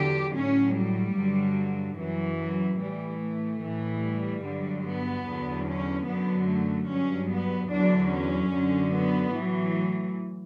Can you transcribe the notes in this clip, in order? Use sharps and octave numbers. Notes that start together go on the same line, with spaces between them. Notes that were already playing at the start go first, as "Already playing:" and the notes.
Already playing: E2 D3 F#3 G4
A2 F#3 C#4
G3
G2 D3 F#3
F#2 E3 F#3
F#3
A2 E3 G3
A3
A2 E3
G3
G2 D3 F#3
B3
E2 D3 F#3
C#4
F#2 D3 F#3 B3
A3
G2 F#3 C#4
B3
E2 D3 F#3 D4
C#4
F#2 D3 F#3
B3
A2 E3 F#3